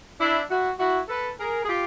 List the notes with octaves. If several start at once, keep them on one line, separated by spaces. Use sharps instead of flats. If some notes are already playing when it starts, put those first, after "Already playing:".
D4 E4
E4 F#4
E4 F#4
A4 B4
G#4 A#4
G#4
F4 G4